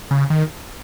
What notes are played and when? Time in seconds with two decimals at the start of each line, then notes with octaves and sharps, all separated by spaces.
0.11 C#3
0.30 D#3